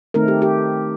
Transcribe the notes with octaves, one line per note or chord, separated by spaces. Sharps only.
D#3 A3 C4 D#4 A#4
G4
G4